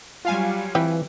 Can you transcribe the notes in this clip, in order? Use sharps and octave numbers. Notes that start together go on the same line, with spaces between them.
F#3 G3 F4 F5 G#5
E3 C4 B4 G5